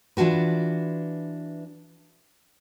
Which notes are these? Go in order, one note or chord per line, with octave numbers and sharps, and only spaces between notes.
E3 D4 F4 F#4 B4